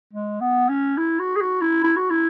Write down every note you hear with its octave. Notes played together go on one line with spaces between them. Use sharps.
G#3
B3
C#4
E4
F#4
G#4
F#4
E4
E4
F#4
E4